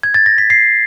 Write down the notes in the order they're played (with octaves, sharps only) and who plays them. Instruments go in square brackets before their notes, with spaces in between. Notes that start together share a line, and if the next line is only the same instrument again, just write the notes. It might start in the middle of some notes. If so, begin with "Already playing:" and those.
[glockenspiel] G#6
A6
A#6
B6
C7